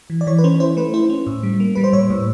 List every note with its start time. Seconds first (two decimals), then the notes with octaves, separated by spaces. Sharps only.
0.10 E3
0.21 D5
0.27 E3 C#5
0.38 B4
0.44 C#4 C5
0.60 E4 C5
0.77 A3 B4
0.94 E4 C5
1.10 C#4
1.27 A2
1.43 G3
1.60 A#3
1.75 G3 B4
1.84 C5
1.93 A2 C#5
2.10 A2